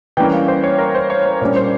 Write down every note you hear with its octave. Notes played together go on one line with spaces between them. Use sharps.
E3 G3 A#3 C#4 G5
F5
C5
C#5
A#4
C5
C#5
C5
A#2 G3 A#3 C#4 C#5
C5